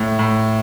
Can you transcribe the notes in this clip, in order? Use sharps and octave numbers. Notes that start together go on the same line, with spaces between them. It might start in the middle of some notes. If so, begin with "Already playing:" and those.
Already playing: A2
A2